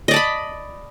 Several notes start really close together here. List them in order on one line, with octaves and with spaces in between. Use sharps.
D#5 D5 A5 B5